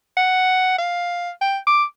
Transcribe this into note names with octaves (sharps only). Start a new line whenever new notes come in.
F#5
F5
G5
D6